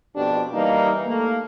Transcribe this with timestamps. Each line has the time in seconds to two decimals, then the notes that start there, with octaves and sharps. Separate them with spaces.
0.16 F2 B2 D4 G4
0.53 E3 G3 A#3 D#4
1.07 A3 A#3